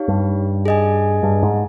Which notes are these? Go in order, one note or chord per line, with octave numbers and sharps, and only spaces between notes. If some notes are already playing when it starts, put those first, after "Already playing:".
Already playing: D#4 G4 C#5 F5
G2
G#4 D#5 G#5
G2
G#2